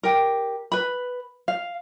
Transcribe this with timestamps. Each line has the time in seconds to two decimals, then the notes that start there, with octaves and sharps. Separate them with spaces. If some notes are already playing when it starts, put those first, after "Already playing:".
0.03 G4 A#4
0.72 B4 B5
1.48 F5